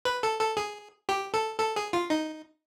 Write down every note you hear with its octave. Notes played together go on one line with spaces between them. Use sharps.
B4
A4
A4
G#4
G4
A4
A4
G#4
F4
D#4